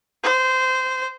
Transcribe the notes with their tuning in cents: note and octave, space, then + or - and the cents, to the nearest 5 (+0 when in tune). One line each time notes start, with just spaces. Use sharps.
C5 -20